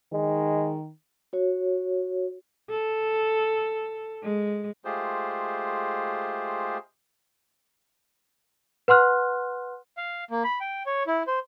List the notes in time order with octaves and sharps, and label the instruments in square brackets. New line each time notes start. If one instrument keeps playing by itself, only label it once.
[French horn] D#3 [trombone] G#3
[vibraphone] F#4 C#5
[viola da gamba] A4
G#3
[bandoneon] G#3 A3 F4 G4 G#4 C5
[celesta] B4 F#5 C6 F6 F#6
[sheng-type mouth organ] F5
A#3
B5
G5
C#5
E4
C5